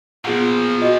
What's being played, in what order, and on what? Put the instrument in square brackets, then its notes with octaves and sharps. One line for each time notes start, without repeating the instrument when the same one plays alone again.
[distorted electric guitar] A#2 F3 [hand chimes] B3 G#4 C7 [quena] F4 [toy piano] F#5
[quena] F#4 [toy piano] D#5